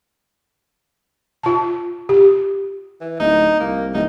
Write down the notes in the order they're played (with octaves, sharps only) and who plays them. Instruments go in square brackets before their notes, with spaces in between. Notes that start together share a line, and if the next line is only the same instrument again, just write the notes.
[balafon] F4 A5
G4
[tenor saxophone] E3
[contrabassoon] D1 [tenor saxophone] D#4
[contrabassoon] C2 [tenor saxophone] A#3
[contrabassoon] D1 [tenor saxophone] D#4